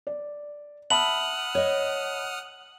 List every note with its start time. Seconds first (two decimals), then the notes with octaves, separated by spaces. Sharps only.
0.07 D5
0.90 E5 F#5 A5 B5 D#6 F6 F#7
1.55 C#5 D#5